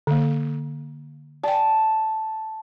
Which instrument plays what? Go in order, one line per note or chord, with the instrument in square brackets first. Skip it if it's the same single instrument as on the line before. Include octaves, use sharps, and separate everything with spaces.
[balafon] D3 A#3
[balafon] D5 G5 [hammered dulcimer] A5